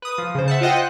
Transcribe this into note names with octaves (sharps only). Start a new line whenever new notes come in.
B4 D#6
F3
C#3 C5
E5 F#5 A5
F4 C5 D#5 F#5 G5
F#6